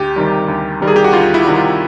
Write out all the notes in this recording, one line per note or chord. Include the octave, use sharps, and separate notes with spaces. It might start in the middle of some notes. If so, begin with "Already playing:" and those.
Already playing: D2 G4
C3 D#3 G3
D2
C3 D#3 G3
G#4
G4
F#4
D2 F4
E4
C3 D#3 G3
F4